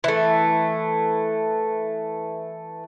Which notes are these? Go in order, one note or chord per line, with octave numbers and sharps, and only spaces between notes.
E3 A3